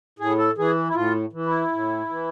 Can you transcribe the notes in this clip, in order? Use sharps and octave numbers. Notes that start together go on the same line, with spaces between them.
A2 G#4
A4
E3 G#4
E4
A2 F4
E3
E4
A2
E3